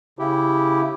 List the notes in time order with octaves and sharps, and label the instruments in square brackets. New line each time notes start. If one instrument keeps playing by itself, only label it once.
[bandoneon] C#3 E4 G4